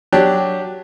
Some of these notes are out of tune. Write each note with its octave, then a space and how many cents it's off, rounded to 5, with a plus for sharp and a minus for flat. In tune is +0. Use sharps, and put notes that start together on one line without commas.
F#3 +0 D4 +0 G4 +0